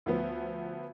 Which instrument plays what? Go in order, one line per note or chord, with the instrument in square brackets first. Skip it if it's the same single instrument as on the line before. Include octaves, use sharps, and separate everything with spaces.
[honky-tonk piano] D2 F3 B3